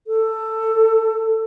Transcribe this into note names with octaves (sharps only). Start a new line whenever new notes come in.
A4